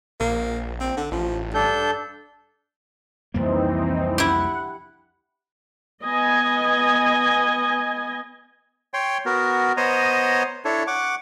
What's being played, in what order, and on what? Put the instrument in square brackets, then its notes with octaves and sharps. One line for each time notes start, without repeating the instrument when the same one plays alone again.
[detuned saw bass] A#1 [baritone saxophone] A#3
[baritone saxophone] C4
D3
[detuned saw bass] A1 [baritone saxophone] F3
[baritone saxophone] G2 [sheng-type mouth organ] D4 A4 G6
[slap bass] C2 F2 A#3 [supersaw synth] E3 C4 D#4
[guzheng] E4 G4 [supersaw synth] F#5
[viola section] B3 D#5 G#5
[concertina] C#5 G5 C6
B3 F#4 A#4
B3 C5 C#5 D#5 A#5 D#6
D4 E4 A4 C#5
F#5 C#6 D6